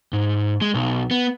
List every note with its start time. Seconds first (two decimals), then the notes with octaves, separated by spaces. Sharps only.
0.13 G#2
0.61 G#3
0.74 B1
1.11 B3